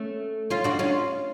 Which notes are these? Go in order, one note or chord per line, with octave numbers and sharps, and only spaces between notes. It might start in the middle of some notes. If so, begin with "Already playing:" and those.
Already playing: A3 C#4
C#4 F4
D4 F#4
C#4 F4